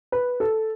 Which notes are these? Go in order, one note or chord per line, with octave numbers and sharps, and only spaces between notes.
B4
A4